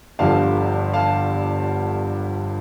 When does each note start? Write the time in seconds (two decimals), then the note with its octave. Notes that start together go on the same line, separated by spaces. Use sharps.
0.19 G1 G2 D3 F3 F5 A5
0.93 F5 A5